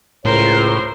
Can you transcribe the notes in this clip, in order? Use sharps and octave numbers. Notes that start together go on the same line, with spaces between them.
C#2 A2 A#4 C5 C#5